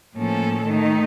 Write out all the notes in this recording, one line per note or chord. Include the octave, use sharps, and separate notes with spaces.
A2 F3 A#3 C#4 A4
D#3 A3 D#4